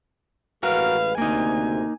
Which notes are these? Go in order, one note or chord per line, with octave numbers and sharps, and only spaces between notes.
A1 G#3 F#4 A#4 B4 F5
D2 C3 A#3 D#4 G#5